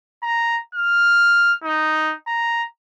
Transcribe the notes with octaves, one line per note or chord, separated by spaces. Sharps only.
A#5
F6
D#4
A#5